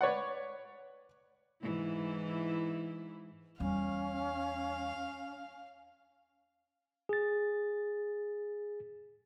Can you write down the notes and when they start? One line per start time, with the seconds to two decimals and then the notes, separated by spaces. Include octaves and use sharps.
0.01 B4 C#5 D5 F#5
1.63 G#2 E3 E4
3.60 E2 G3 C#4 F5
7.09 G#4 A6